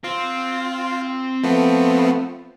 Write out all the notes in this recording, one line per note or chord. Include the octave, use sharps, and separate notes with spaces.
C4 F4
F3 A3 B3